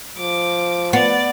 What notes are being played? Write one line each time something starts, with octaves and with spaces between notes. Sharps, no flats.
F3 D6
B3 D5